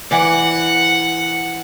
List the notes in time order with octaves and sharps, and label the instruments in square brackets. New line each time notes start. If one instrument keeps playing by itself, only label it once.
[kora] E3 D5 [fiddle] F#5